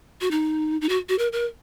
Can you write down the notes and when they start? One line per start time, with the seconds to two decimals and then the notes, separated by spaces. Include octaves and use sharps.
0.21 F#4
0.31 D#4
0.81 D#4
0.89 F#4
1.09 F#4
1.19 A#4
1.32 A#4